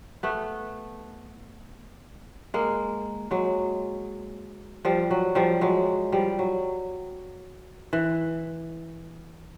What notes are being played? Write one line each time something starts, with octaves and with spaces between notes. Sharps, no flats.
A3 B3
G#3 A#3
F#3 G#3
F3 G3
F#3
F3 G3
F#3 G#3
F3 G3
F#3
E3